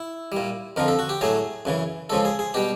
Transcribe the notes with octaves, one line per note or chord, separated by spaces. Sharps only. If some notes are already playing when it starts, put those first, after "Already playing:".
Already playing: E4
A#2 G3
F2 D3 F3 A#4
A4
F#4
G4
A2 F#3 A3 G#4
F#2 C#3 E3
C#2 C#3 F3 A4
G#4
G#4
B2 G3 G4